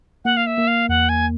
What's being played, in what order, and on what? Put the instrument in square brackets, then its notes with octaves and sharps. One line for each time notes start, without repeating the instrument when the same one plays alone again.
[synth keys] A#3 [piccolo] F#5
[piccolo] F5
E5
[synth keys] A#3
[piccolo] F5
[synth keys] E2 [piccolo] F#5
[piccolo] G#5